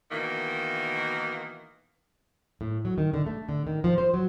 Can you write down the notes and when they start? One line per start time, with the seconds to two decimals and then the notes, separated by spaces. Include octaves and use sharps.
0.11 B2 D#3 E3 A#3
2.61 A2
2.85 F#3
2.98 D#3
3.14 D3
3.26 A3
3.49 D3
3.67 D#3
3.84 F3
3.98 C5
4.14 F#3